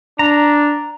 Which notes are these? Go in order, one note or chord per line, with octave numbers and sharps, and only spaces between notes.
D4 A#5